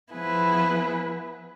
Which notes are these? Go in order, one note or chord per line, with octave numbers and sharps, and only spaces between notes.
F3 B3 E4 G#4 B4